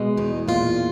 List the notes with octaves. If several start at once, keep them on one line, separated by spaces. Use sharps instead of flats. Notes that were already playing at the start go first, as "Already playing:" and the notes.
Already playing: B2 G#3
E2 D#4
A#2 F4